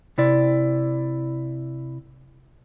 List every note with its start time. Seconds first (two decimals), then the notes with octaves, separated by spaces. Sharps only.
0.18 C3 E4 D5